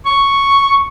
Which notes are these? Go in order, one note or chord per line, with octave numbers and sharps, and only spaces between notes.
C#6